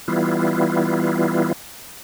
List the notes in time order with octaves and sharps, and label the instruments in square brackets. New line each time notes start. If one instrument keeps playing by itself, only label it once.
[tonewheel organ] E3 G3 B3 E4 F4